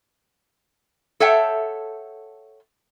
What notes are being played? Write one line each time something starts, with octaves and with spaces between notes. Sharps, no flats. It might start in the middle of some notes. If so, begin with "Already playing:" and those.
A4 C#5 E5 F#5 G5 A5